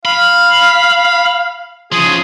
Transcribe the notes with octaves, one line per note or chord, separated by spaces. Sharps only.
F5 B5
C#3 F3 G#4